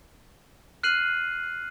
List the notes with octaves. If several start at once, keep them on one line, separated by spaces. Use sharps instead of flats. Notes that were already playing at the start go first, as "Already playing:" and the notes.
F6 F#6 C7 D#7 F#7